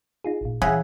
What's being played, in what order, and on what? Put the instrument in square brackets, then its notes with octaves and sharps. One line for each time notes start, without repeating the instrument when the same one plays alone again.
[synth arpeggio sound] D#4 F4 G#4
A1 A#2
[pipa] C#3 [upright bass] E3 [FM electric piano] G#4 E5 F#5